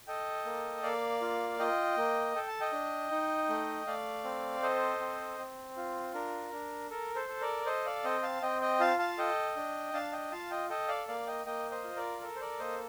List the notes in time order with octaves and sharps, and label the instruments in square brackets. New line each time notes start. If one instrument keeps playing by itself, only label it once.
[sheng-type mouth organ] A4 D#5 G5
A#3
A#3 D5 F5
F4
F4 D#5 G5
A#3
A4 G5
A5
D#5 G5
D4
D#4
A3
A3 D5 F5
C4
A4 C5 D#5
C4
C4
F4
D4 A#4
D4
A4 A#4
A4 C5
A4
A#4 D5
A4 C5 D#5
D5 F5
C4 D#5 G5
F5 A5
C4 D#5 G5
D#5 G5
F4 F5 A5
F5 A5
A4 D#5 G5
D4
D4 F5 A5
D#5 G5
F4 F5 A5
D#5 G5
A4 D#5 G5
D5 F5
A#3 D5 F5
D#5 G5
A#3 D#5 G5
C5 D#5
F4
A#4 D5
A4 A#4
C5
A#4 D5
A#3 C5 D#5